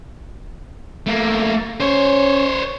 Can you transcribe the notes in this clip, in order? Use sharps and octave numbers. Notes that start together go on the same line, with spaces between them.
A3 A#3
C#4 C5 C#5